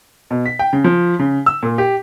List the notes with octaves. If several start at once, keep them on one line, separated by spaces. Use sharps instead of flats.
B2
B6
G5
C#3
F3
C#3
E6
A#2
G4